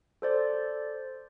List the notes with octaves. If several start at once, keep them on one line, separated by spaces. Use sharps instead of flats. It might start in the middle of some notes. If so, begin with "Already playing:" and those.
A4 C5 D5